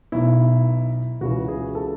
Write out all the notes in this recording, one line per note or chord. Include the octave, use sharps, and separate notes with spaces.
B1 B2 E4
C#2 C#3 E3 F#4
G#4
A4